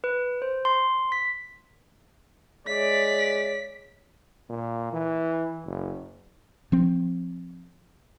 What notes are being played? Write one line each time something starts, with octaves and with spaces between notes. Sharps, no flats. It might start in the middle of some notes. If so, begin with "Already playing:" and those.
B4
C5
C6
B6
G#3 C#5 D5 E5 B6
A#2
E3
F#1
F3 C4